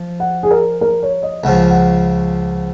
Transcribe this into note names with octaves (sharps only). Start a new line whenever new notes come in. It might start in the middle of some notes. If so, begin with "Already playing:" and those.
Already playing: F3
F#5
G#4
A#4
A#4
C#5
D#5
C#2 C#3 F3 F#5
F#5